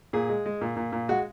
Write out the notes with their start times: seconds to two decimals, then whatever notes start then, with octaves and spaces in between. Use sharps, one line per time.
0.13 A#2 G#4
0.29 G#3
0.46 G#3
0.61 A#2
0.76 A#2
0.92 A#2
1.08 G#3 F#4